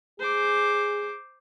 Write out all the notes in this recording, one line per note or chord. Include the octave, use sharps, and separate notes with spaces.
G#4 C5 D6